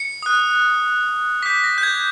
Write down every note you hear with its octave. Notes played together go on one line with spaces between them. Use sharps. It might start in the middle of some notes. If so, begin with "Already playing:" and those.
Already playing: C#7
D#6 F#6
D6 G6 B6
A#6
G6
G#6